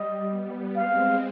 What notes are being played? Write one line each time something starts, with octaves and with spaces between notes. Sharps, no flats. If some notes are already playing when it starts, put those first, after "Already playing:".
Already playing: G3 D#5
G3 B3
G#3 C4 F5